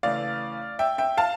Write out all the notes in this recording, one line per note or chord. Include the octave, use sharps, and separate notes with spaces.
C#3 E3 A3 D5 F5
E5 G5
E5 G5
F5 A5